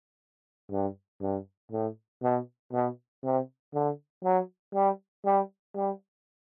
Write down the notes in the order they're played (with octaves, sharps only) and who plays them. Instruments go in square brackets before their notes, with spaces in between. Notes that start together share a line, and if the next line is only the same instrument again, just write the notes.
[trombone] G2
G2
A2
B2
B2
C3
D3
F#3
G3
G3
G3